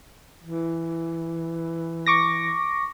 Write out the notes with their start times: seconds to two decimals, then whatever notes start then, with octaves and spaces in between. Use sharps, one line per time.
0.43 E3
2.06 C#6 D6 A#6